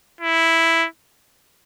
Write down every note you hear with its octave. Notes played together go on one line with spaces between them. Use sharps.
E4